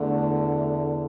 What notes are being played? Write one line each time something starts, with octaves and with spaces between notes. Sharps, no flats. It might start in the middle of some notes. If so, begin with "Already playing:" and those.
Already playing: E2 D3 A3
A3